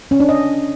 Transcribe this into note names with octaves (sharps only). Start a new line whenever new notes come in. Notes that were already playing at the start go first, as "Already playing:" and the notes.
C#4
D4
D#5